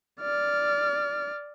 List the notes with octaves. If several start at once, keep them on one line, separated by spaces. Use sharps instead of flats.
D5 F6